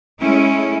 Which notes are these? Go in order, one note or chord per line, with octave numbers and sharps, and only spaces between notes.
G#3 A3 C#4 E4